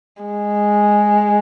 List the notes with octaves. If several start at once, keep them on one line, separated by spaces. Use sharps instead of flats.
G#3